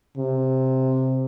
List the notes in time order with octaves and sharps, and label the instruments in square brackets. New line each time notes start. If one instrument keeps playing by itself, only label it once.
[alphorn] C3